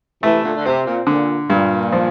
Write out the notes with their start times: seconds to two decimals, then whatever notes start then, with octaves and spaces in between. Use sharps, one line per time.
0.23 C3 E3 A3
0.43 A#2 D3
0.56 D3
0.65 C3 C4
0.86 A#2
1.07 A#2 D3
1.49 G2 A#2
1.93 F3